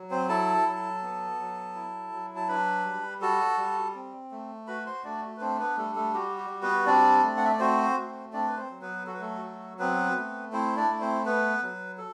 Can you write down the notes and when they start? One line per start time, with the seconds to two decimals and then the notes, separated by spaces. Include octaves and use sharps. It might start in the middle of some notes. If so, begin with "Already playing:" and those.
Already playing: F#3
0.11 C4 C5
0.29 E4 A4 A5
0.66 F#3
1.02 B3
1.39 F#3
1.75 E4
2.12 F#3
2.36 A5
2.48 D4 B4 B5
2.85 G3
3.21 F#4 A4 A5
3.58 G3
3.95 C4
4.31 A3
4.67 F#4 B4 B5
4.86 C5 C6
5.04 A3 D4 D5
5.37 B4
5.41 C4 D4 C5
5.59 B3 B4
5.77 G3 A3 A4
5.96 A3 A4
6.14 F#4 G4
6.38 G4
6.50 G3
6.63 B3 B4
6.87 C4 D4 D5
7.23 A3
7.37 F#5
7.45 E5
7.53 D5
7.59 C4 F#4 C5
7.97 A3
8.33 C4 D4 D5
8.48 B4
8.57 C4 C5
8.70 F#3
8.81 B3 B4
9.06 F#4 A4
9.14 B4
9.20 A3 A4
9.42 F#3
9.79 B3 C4 B4
10.16 A3
10.52 C4 E4 C5
10.77 D4 D5
10.88 A3
11.01 C4 C5
11.26 B3 B4
11.62 F#3
11.98 A4